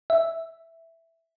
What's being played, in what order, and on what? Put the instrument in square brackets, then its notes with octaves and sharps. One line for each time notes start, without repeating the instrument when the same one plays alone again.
[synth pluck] E5